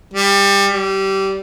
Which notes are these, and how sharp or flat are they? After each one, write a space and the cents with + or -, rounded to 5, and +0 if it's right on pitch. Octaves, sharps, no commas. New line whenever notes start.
G3 +25
G3 -20